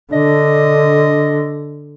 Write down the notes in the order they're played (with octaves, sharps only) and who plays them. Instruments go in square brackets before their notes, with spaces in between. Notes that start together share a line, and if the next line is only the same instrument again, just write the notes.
[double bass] D3 [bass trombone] D4 [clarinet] D#5